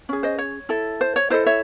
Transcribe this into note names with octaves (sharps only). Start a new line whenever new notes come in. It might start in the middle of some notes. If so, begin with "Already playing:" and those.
C#4 G#4
C5 D#5
C#5
E4 A4
C5
C#5
E4 A4 C5 D#5
C#5 E5